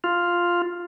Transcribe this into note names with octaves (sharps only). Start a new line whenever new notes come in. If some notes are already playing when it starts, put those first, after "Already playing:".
F4